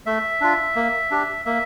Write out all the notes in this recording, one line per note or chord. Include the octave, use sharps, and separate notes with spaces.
A3 E5
D4 F4
A#3
D4 G4
A#3 E5